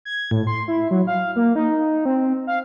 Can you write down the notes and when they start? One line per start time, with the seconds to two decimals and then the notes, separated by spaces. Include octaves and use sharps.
0.05 G#6
0.31 A2
0.47 C6
0.68 E4
0.91 F#3
1.07 F5
1.36 A#3
1.55 D#4
2.05 C4
2.47 F5